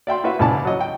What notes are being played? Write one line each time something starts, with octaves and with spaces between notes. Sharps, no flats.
D5 E5 G5 C6
E4 F#4 B4 E5 F5
C#2 G#2 E4 D5 A5 D6
F#3 D#5
G5